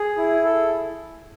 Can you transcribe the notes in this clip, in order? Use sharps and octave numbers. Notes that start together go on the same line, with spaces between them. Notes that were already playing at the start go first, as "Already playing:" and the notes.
Already playing: G#4
E4
A4